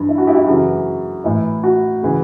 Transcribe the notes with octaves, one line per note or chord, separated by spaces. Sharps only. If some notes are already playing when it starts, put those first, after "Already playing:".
Already playing: G2 E3
E4
F#4
E4 G4
F#4
E4 G4
F#2 C#3 E3 F#4
A2 E3 E4
F#4
C#3 E3